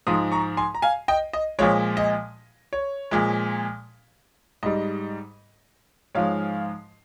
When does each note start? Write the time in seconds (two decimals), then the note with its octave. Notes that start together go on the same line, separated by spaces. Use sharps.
0.07 G#2 F3 G#3 C6 D#6
0.32 A#5 C#6
0.57 G#5 C6
0.75 A#5
0.82 F5 G#5
1.08 D#5 G5
1.33 D#5
1.59 A#2 F3 G#3 C#5
1.97 D#5
2.73 C#5
3.11 A#2 F3 G#3
4.63 G#2 G3 D#5
6.15 G#2 F3 G#3 C#5 F5